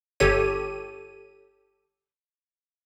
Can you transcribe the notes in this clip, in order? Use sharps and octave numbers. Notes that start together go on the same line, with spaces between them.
G1 G4 A4 C#5 D#7